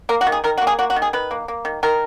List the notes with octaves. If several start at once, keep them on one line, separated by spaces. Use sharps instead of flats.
A#3 A#4
F#4
D#3
G#4
D#3 A#4
F#4
A#3
G#4
A#3 F#4
F#4
D#3
G#4
D#3 B4
A#3
A#3
D#3
D#3 A#4